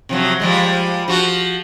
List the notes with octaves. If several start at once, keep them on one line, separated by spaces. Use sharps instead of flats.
C3 F3 F#3
F3 G3 G#3
F3 F#4